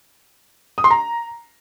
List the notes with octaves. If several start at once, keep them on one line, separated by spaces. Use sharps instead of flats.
D#6
C6
A#5